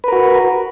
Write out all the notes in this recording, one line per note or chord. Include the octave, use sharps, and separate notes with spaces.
F#4 A#4 B4